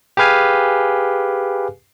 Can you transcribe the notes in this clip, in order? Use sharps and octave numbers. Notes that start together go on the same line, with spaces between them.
G4 G#4 B4 F5 G#5